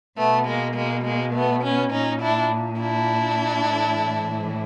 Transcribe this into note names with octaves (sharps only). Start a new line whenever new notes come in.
B2 A3 B3
G#3 A#3
G#3 A#3
G#3 A#3
A3 B3
B3 C#4
A#2 C#4 D#4
D4 E4
D4 E4
A2 E3